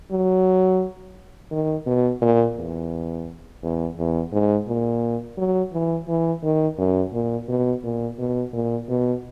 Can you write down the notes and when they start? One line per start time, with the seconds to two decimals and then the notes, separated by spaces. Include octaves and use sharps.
0.11 F#3
1.52 D#3
1.87 B2
2.22 A#2
2.57 E2
3.63 E2
3.98 E2
4.33 G#2
4.68 A#2
5.38 F#3
5.73 E3
6.08 E3
6.43 D#3
6.78 F#2
7.13 A#2
7.49 B2
7.84 A#2
8.19 B2
8.53 A#2
8.89 B2